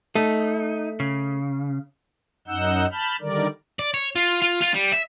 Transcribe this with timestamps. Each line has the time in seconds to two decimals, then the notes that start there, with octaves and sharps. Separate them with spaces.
0.15 A3 D#4
1.00 C#3
2.47 F#2 D#4 F#5 E6 G6
2.92 A5 B5 F6 G6
3.21 D3 D#3 G3 A#4 D5
3.79 D5
3.94 C#5
4.15 F4
4.42 F4
4.62 F4
4.75 G3
4.93 E5